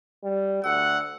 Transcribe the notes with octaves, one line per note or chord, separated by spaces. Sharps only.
G3
D2 F#5 E6